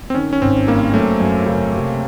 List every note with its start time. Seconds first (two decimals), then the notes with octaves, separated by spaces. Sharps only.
0.10 C4
0.15 D#3 C#4
0.33 C#4
0.42 G#1 C4
0.67 G2 A#3
0.93 F#3 A3
1.20 F#2
1.46 C#3
1.73 C3